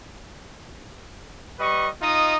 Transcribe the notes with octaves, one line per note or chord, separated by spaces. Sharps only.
G3 B4 D#5 C#6
D#4 F4 D#5 D#6